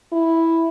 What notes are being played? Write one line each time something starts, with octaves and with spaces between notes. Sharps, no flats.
E4